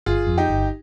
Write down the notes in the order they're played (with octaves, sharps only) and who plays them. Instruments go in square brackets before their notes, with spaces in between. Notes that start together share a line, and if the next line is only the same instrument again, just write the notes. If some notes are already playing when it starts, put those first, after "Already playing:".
[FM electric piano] G1 [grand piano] F4 G#4
[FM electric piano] F2
[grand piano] D#4 G4
[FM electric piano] G1